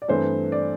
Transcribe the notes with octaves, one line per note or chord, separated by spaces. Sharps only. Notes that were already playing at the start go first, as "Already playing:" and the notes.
D5
G2 E3 A3 C4 C5
D5